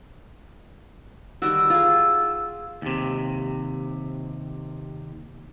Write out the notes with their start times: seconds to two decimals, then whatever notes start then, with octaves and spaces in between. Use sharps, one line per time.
1.42 D#3 G3 F#4 E6
1.70 F4 G#4
2.82 D#2 C3